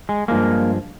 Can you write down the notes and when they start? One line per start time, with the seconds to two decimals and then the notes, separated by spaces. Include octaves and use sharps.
0.09 G#3
0.28 G2 F3 G#3 A#3